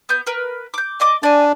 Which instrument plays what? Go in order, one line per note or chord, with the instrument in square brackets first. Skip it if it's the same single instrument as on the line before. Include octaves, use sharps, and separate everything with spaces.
[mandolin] B3 G6
A#4 B4
D6 G6
D5 D#5 D6
[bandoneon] D4 [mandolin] D5 G#5